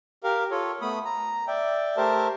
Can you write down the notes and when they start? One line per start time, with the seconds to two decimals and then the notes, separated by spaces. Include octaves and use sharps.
0.24 G4 A#4 F5
0.51 F4 A4 C#5
0.81 A3 B3 B5 D#6
1.05 A#5
1.48 D5 E5 G5
1.97 A3 G4 A#4 C5 E5 A5